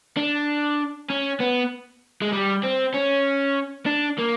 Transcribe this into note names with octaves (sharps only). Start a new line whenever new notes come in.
D4
C#4
B3
G#3
G3
C4
C#4
D4
A#3